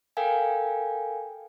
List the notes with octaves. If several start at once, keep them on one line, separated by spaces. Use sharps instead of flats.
A4 A#4 F5 G5 G#5